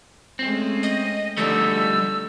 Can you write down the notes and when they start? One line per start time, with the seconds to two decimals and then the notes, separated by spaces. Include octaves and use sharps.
0.39 G#3 A3 C4 C#4
0.83 D#5
1.37 D3 F3 G3 A3 D#4 E6